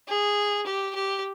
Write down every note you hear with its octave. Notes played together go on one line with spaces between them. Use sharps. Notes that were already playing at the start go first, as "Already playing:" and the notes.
G#4
G4
G4